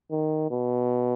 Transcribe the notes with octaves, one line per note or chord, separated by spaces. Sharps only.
D#3
B2